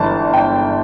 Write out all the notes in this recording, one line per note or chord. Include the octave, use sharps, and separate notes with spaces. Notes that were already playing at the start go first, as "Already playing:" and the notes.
Already playing: G1 G2 E3 A5
G5